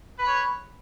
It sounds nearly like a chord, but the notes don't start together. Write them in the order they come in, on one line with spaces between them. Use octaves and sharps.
B4 B5 C#5